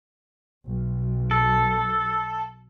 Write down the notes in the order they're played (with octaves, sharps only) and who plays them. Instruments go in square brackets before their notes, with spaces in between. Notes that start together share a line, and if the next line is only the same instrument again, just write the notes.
[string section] B1
[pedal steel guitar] A4